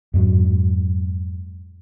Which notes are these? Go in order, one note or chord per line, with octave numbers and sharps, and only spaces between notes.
F2 G#2 F#3